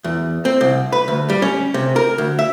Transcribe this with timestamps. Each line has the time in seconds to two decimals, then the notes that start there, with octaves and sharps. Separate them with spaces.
0.04 E2
0.45 C4
0.61 C2
0.92 B4
1.08 D2
1.30 G3
1.42 C#4
1.74 C3
1.96 A#4
2.18 D2
2.39 E5